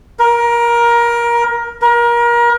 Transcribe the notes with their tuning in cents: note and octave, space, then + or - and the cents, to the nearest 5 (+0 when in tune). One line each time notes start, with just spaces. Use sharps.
A#4 +20
A#4 +30